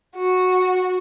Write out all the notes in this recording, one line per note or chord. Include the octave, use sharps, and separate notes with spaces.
F#4